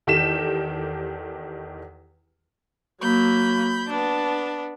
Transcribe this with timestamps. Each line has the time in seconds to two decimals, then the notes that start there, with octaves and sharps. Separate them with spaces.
0.07 E2 D#3 G4 A4 B6 E7
3.01 F#3 A#3 B5 G6
3.89 B3 D4 A5